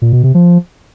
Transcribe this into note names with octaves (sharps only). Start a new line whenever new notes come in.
A#2
B2
C3
F3